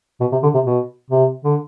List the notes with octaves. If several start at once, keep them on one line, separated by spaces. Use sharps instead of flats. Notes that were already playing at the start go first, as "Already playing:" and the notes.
B2
C3
D3
C3
B2
C3
D3